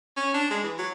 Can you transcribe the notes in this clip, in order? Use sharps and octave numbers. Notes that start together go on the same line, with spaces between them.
C#4
D4
G#3
E3
F#3